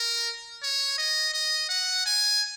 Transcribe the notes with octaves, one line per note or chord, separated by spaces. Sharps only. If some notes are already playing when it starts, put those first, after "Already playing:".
Already playing: A#4
C#5
D#5
D#5
F#5
G#5